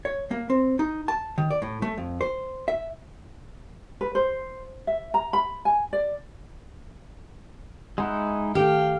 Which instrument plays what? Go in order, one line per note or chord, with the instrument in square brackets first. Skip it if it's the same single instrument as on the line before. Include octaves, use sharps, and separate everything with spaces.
[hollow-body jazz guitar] C#5
A#3
C4
D#4
A5
D#3
D5
A2
A3
F2
C5
E5
[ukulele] B4
C5
E5
A#5
B5
G#5
D5
[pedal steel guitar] G#3 D#4 E4 [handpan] F#5
[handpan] D#3 A3 A4 [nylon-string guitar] G4 [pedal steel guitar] F5 [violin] G5